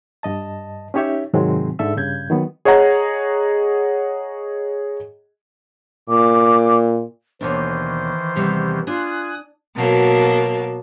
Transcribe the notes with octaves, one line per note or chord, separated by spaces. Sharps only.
G2 D#5 A5
C#4 D#4 G4 C#5 E5
G#2 C3 D#3 F#3 G#3 C4
G#2 D3 A4 E5 E6
G2 C#3 G6 G#6
D#3 F#3 B3
G#4 C#5 D#5 F#5 A#5
A#2 D6
D#2 B2 D#3 E3 D4 C5
E2 C3 G3
D4 F4 G#5 D#6 F#6
B2 F#3 A#3 A5